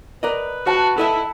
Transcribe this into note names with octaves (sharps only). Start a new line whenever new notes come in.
A#4 B4 D5 D#5
F#4 F#5 A5
E4 A4 D#5 E5